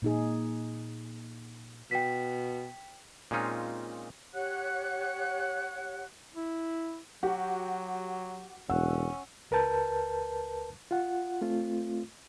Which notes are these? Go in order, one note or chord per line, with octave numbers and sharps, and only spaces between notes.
A#2 D#4 G#4
B2 G5 B6
A#2 G#3 C4 C#4 D#4 F4
G4 C#5 F#5 F#6
E4
F#3 F#4 G4
E1 C#4 F#5 E6
C#2 A#4 B4 A5 G6
F4 F#5
A3 C4 F4